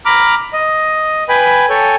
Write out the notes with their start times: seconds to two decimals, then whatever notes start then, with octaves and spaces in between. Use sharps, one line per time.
0.06 A#5 B5 D6 F6
0.53 D#5
1.29 B4 G5 G#5 B5
1.69 A4 C#5 G5 G#5